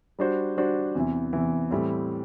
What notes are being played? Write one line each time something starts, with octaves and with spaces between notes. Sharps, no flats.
G3 D4 F#4 C5
G3 D4 F#4 C5
E2 C3 E3
E2 C3 E3
A2 E3 G3 C4